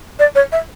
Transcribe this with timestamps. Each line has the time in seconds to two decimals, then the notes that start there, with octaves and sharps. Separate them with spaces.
0.19 D5
0.35 C#5
0.52 E5